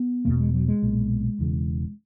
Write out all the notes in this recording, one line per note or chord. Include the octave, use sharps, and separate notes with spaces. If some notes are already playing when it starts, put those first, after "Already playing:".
Already playing: B3
E1 E2 B2 A#3
G#3
F#3
G#3
B1 A#2
E1 E2 C#3